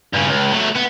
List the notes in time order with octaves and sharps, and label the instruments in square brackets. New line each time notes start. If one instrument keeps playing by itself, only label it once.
[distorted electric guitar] G2 C#3
C#2
F#3 A3
B3